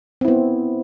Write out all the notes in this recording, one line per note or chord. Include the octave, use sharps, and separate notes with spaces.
B3 C4 E4